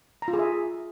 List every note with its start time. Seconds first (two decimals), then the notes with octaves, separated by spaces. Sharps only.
0.22 A#5
0.28 F4
0.33 G#4
0.39 E5